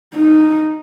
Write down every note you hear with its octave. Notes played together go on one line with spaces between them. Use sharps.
D#4